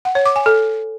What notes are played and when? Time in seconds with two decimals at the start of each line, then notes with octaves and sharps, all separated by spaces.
0.05 F#5
0.15 C#5
0.26 D6
0.36 G#5
0.46 A4